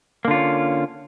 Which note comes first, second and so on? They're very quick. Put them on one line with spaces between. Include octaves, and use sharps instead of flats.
A#3 D3 F4 C#4